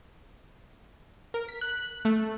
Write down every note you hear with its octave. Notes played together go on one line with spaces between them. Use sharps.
A#4
B6
F#6
A3